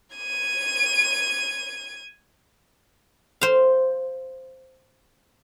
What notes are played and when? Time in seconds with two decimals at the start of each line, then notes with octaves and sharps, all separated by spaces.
0.16 G#6 D#7
3.41 C5 F5